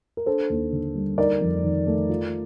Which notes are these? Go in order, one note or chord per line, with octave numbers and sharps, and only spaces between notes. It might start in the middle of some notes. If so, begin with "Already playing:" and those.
A#4
D4 A4 C5
D#2
D3
G3
D#4 A#4 D5
F2
D#3
A3
F4